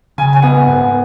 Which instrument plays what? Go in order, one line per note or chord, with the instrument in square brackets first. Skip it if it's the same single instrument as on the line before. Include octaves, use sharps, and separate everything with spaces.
[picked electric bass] C#3 [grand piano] G#5
[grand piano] G#5
[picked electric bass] B3 [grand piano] F#5
[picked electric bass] G#2